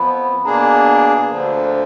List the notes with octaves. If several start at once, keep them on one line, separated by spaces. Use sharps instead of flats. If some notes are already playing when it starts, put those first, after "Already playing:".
Already playing: F2 F3 B3 B5
B2 A#3 D4 G#4 A#5
D2 D3 F3